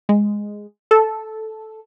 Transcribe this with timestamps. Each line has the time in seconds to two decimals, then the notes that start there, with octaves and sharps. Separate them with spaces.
0.09 G#3
0.91 A4